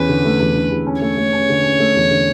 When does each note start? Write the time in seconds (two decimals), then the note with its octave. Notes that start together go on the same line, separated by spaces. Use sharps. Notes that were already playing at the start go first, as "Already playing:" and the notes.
Already playing: E2 C#4 B4
0.09 D3
0.25 A3
0.40 E2
0.55 D3
0.71 E2
0.87 C#4
1.02 A3 C#5
1.17 A3
1.33 C#4
1.49 D3
1.64 C#4
1.80 A3
1.96 E2
2.11 D3